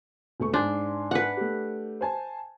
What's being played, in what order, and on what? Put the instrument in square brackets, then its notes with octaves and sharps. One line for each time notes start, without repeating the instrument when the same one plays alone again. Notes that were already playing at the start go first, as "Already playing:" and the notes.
[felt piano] E1 A3 C#6
[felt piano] G#2 G#5 C6 [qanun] D4
[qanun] B4 F#5
[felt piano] A3 G4
C5 G#5 A5